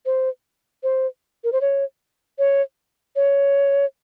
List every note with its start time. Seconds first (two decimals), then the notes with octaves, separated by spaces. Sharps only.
0.06 C5
0.83 C5
1.44 A#4
1.52 C5
1.61 C#5
2.39 C#5
3.16 C#5